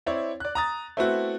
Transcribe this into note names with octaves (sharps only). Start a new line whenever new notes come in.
C4 E4 C#5 D5
D5 F#6
A#5 D#6 A6
A3 B3 C4 E4 F#4